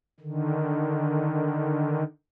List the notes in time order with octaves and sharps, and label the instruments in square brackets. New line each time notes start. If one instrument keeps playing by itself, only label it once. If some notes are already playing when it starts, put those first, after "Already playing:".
[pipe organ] D3 D#3